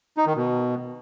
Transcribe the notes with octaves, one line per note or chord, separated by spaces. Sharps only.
D#4
D#3
B2